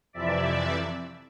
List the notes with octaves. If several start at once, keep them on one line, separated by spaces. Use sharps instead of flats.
F2 C3 E3 D5 E5